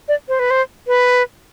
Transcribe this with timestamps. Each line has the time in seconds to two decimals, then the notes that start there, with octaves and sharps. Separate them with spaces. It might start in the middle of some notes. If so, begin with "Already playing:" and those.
0.08 D5
0.28 C5
0.39 B4
0.50 C5
0.87 B4